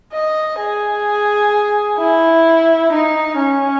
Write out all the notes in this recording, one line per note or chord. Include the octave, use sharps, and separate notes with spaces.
D#5
G#4
E4
D#4
C#4